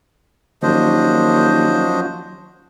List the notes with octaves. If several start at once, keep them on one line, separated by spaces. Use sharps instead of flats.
D#2 F3 F#3 C#4 D4 C5 D#5